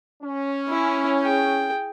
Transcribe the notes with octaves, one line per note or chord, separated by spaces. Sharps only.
C#4
E4
G#4 G5